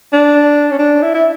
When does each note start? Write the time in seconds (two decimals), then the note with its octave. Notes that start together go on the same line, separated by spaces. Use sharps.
0.13 D4
0.71 C#4
0.79 D4
1.02 E4
1.14 E4